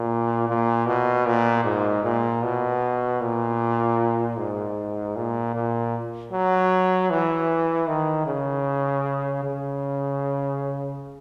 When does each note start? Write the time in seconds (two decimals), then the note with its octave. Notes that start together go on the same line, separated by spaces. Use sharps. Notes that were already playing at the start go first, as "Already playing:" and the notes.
Already playing: A#2
0.48 A#2
0.86 B2
1.26 A#2
1.64 G#2
2.04 A#2
2.43 B2
3.21 A#2
4.37 G#2
5.16 A#2
5.55 A#2
6.32 F#3
7.11 E3
7.88 D#3
8.27 C#3
9.44 C#3